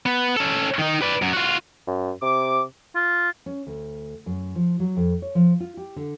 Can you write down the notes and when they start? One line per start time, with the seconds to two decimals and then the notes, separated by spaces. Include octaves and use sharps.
0.06 B3
0.37 C#4 A4
0.79 D#3 D#4
1.02 B4 D5
1.22 F#2
1.33 F4 F#4
1.87 F#2
2.22 C3 D6
2.95 F4
3.46 C#4
3.67 D2
4.26 F#2
4.55 F3
4.80 F#3
4.96 F2
5.22 C#5
5.35 F3
5.60 F4
5.77 G4
5.96 D3